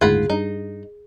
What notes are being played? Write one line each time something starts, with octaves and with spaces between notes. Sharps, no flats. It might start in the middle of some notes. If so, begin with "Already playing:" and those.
F#1 D2 G#2 F4 G#4 F#5 B5
G2 D#4